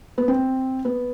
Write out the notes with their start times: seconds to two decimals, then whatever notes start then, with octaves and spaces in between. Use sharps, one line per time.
0.18 B3
0.28 C4
0.85 B3